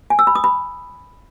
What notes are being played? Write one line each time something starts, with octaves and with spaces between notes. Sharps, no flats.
G#5
E6
B5
D#6
B5